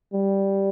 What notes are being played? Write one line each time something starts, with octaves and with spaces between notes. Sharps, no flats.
G3